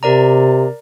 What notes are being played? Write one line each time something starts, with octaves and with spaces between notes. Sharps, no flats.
C3 A#4 D5 A#5